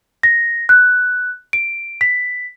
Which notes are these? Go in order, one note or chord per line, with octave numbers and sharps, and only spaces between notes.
A#6
F#6
D7
B6